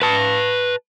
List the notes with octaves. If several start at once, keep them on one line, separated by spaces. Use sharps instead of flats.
B4 A5